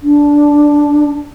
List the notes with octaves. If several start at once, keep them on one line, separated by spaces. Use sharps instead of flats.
D4